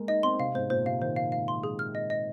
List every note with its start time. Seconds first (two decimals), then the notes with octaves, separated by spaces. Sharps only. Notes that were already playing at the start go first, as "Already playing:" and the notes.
Already playing: G#3 A#3
0.08 D#4 D#5
0.23 C4 C6
0.39 C3 F5
0.55 G#2 C5
0.70 A#2 C5
0.86 C3 F5
1.02 D#3 C5
1.16 F5
1.32 F5
1.48 C6
1.63 G#4
1.79 F6
1.95 D#5
2.10 D#5